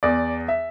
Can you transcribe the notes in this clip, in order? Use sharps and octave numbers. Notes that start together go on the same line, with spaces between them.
E2 D5
E5